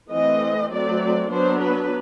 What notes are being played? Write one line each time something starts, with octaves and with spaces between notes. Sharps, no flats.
E3 A3 C4 D#5
F#3 A3 C4 D5
F#3 B3 D4 C5
B4